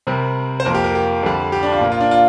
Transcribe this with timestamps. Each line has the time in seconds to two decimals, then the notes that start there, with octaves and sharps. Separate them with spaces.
0.07 C3 G3 C4 A#4
0.60 C5
0.65 F2 F3 A#3 A#4
0.74 G4
0.84 A#4
0.95 G4
1.23 F2 D3 G3
1.52 G4
1.63 D4
1.72 F4
1.81 A#2 A#3
1.92 F4
2.00 D4
2.11 F4